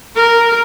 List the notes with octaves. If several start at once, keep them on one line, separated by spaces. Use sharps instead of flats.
A#4